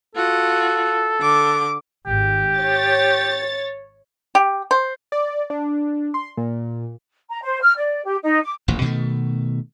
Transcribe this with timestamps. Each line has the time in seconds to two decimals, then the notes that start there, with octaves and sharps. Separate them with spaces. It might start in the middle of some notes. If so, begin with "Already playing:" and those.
0.16 F4 F#4 A4
1.20 D3 D6
2.06 G#1 G4
2.57 C#5 A6
4.35 G4
4.71 C5
5.12 D5
5.50 D4
6.14 C6
6.37 A#2
7.29 A#5
7.42 C5
7.61 F6
7.77 D5
8.04 G4
8.22 D#4
8.43 D6
8.68 D#1 A1 A#2
8.82 B2 D#3 F#3 A3